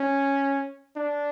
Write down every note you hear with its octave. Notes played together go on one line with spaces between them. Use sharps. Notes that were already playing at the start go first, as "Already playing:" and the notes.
Already playing: C#4
D4